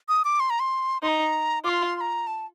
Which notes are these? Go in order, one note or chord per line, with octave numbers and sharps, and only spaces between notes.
D#6
D6
C6
A#5
C6
D#4 C6
A#5
F4 C6 D6
C6
A#5
A5